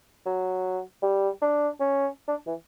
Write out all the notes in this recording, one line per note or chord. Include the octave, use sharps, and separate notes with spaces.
F#3
G3
D4
C#4
D4
E3